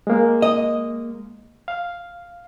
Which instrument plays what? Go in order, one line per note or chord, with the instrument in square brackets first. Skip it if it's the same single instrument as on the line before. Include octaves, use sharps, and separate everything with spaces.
[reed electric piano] G#3 A#3
[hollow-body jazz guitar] D#5
[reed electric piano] F5